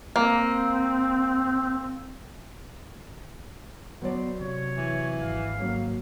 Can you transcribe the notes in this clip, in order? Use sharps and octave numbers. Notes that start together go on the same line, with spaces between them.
A#3 C4
F#3 B3 C5 D5
C3 C#5
E3
G#1 F5
F#3 A#3